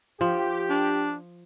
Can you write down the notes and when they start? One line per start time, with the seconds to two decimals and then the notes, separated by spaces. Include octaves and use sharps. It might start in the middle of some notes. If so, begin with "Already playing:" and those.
0.21 F3 G4
0.70 D4